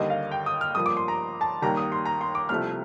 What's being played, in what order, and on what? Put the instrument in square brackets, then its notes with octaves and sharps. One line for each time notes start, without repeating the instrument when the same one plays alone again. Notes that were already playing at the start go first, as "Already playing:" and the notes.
Already playing: [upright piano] D#2 D3 G3 A#3 D#5
F5
G5
D#6
F6
G2 F3 A#3 D#6
D6
C6
A#5
A5
D#2 D#3 G3 A#3 A#5
D#6
C6
A#5
C6
D6
C2 C3 F3 A3 C4 F6